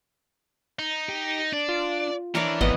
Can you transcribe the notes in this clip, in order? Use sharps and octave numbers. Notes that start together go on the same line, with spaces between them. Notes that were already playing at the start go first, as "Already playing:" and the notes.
D#4
G4
D4 D5
F4
E3 D4 A#4 C#5 D5
G#1 F2 B3 D#5 F#5